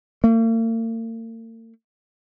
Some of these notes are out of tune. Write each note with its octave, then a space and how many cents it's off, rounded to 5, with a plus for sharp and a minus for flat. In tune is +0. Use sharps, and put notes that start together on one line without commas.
A#3 -45